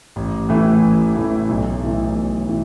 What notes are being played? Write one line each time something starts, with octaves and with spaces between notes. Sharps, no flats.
A1
A2 E3 A3 E4
A1
A2 E3 A3 E4
B1
A2 E3 A3
B1
A2 E3